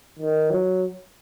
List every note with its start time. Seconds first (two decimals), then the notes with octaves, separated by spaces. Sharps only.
0.19 D#3
0.50 F#3